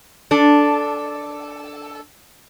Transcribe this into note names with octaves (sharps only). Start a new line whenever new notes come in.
D4 A4